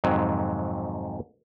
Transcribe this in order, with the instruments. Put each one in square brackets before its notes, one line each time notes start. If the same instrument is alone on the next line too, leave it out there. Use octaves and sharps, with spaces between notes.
[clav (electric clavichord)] F2 G#2 C3 D#3 F#3